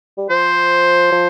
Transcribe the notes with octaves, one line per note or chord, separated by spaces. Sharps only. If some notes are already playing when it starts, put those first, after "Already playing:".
G3
F3 C5
F3